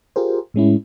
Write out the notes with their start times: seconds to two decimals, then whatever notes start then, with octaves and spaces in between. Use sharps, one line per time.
0.16 F4 G4 G#4 A#4 C5
0.54 A2 G#3 C#4 E4